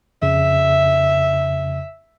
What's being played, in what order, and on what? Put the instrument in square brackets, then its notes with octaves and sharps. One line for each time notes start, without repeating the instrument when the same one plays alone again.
[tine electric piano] F2 C#3 [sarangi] E5